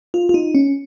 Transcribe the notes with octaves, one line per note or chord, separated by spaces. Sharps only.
F4
F4
D#4
C#4